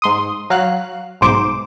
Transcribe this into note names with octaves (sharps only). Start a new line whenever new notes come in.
G#2 C6 D#6
F#3 F5 F#6
B1 G#2 C5 D6